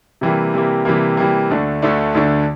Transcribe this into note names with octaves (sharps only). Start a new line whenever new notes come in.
C3 E3 G3 A#3
C3 E3 G3 A#3
C3 E3 G3 A#3
C3 E3 G3 A#3
D2 D3 A3 D4
D2 D3 A3 D4
D2 D3 A3 D4